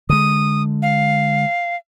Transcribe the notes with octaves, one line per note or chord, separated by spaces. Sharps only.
D3 G#3 D#6
F5